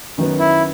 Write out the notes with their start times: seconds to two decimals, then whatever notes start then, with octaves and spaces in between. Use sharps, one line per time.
0.18 F#2 D#3 F#3 B3
0.40 E4